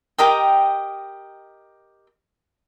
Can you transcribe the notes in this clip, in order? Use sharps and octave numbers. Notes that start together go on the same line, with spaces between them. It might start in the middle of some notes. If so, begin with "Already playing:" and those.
G4 A#4 D#5 G5